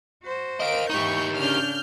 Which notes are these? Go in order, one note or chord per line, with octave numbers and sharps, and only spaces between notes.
F#4 C5
A#4 D#5 F5 D7
G#2 E3 D#4 G4 C#6 G6
C#3 D4 F6 G6